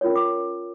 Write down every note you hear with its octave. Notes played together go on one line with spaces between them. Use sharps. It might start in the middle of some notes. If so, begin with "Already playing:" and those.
C#4 F4 A#4 C#5
D6